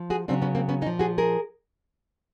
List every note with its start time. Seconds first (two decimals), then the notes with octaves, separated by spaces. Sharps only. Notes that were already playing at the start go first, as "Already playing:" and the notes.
Already playing: F3
0.10 F#4 G#4
0.28 C#3 F#3 C4 D4
0.42 B3 C#4
0.55 A#3 C4
0.69 B3 C#4
0.81 A#2 C#4 D#4
0.87 F3
0.99 F#4 G#4
1.18 G#4 A#4